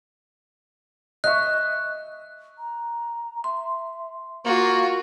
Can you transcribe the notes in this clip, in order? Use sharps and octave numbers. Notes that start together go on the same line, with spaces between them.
D#5 E5 C#6 F#6
A#5
E5 C6
A#3 F4 F#4 C#6